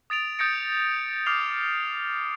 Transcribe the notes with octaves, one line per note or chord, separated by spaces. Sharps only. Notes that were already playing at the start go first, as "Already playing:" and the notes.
D#6 A6 D7 F7
D#6 G6 A6 A#6 C#7 D7
D6 D#6 F6 C7 F7